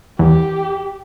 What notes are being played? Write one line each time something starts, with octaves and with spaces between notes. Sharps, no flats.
E2 G4